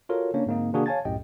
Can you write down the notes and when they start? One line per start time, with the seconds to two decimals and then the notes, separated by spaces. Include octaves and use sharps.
0.09 F4 F#4 A4 A#4 C#5
0.34 C#3 A#3 C#4 D4 C#5
0.46 G#2 D3 A#3 C4 D#4
0.73 C3 D#3 A#3 D4 F#4 G#4
0.86 C#5 F5 G#5 A5 G#6 A6
1.05 C2 F#2 A2 G4 D#5 G5